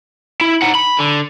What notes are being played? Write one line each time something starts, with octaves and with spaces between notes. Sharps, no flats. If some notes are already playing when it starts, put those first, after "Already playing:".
E4
D#4 F#5
B5
D3